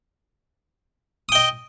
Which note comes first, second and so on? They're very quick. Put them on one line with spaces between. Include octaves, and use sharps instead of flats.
D#6 G5 D#5